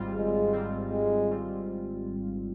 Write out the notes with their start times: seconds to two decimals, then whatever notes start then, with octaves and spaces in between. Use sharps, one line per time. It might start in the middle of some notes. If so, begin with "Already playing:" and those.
Already playing: G#1 G#2 G3 C4 F4
0.14 G#1 G#3
0.53 G#2 G3 C4 F4
0.91 G#1 G#3
1.31 G3 C4 F4